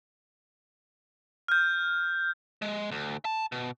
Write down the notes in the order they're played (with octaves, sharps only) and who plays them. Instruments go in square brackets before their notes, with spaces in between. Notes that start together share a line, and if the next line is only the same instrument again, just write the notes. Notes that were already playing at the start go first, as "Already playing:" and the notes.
[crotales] F6 G6
[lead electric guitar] G#3
D2
A5
B2